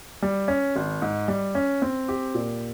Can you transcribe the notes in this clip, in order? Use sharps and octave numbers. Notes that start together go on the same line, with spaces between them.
G3
C#4
G#1
G#2
G3
C#4
C4
G4
A#2